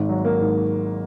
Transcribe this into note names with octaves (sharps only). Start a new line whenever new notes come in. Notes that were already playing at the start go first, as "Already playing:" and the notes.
Already playing: G#1 G#2
F#3
A#3
G#2